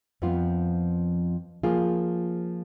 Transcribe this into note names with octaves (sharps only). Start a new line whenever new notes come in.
F2 F3 B3 F4
F3 A#3 F4 G#4